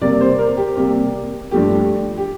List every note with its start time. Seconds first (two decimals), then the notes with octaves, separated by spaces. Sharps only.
0.01 C3 G3 A#3 D5
0.21 C5
0.38 A#4
0.57 G4
0.77 C3 G3 A#3
1.51 G2 F3 A3 G4
2.18 G4